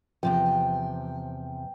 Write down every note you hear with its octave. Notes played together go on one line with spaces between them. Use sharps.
E2 C3 F3 G5